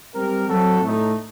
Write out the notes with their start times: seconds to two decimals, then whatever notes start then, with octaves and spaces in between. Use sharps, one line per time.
0.14 G3 C4 G4 A#4
0.48 F#3 C4 F#4 A4
0.81 A2 A3 D#4